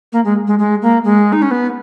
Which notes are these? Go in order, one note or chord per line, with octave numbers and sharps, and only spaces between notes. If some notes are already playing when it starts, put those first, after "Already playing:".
A#3
G#3
G#3
G#3
A#3
G#3
D#4
C#4
B3